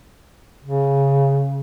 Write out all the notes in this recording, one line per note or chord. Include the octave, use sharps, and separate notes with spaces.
C#3